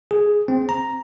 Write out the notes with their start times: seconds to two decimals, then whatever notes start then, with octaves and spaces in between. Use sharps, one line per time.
0.11 G#4
0.48 C4
0.69 A#5